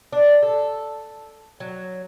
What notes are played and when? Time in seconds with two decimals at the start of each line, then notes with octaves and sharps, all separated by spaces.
0.12 D4
0.42 A4
1.60 F#3